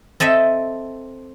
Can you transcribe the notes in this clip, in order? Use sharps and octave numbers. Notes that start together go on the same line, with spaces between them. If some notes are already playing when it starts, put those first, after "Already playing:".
C4 A4 D#5 E5